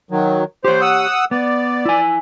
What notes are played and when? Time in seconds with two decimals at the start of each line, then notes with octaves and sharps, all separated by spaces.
0.11 D#3 F#3
0.64 G4 C5 C#5
0.81 F#5 D#6 E6
1.31 B3 D5
1.85 E4 G#5